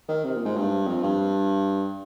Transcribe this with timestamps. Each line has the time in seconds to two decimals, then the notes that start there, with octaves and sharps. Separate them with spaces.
0.08 D#3
0.24 C3
0.36 A#2
0.45 G#2
0.56 G2
0.87 F2
1.03 G2